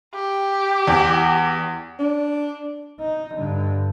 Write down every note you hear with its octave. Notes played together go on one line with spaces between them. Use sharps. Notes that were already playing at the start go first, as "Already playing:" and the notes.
G4
E2
D4
D#4
G2 D3